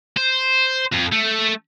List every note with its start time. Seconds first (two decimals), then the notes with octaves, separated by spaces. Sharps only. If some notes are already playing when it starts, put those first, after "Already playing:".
0.17 C5
0.92 F2
1.12 A3